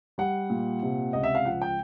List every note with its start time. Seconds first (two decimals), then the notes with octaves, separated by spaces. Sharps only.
0.18 G3 F#5
0.50 A#2
0.83 C3
1.13 C#2 D#5
1.24 E5
1.35 F5
1.45 F3 F#5
1.61 G5